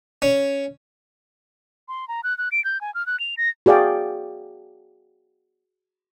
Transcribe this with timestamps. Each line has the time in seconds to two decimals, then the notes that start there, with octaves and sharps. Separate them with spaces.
0.22 C#4
1.88 C6
2.08 A#5
2.24 F#6
2.38 F#6
2.52 D7
2.65 G6
2.81 G#5
2.95 F6
3.07 F#6
3.20 F7
3.37 A#6
3.66 F#4 G#4 D5 F5 G5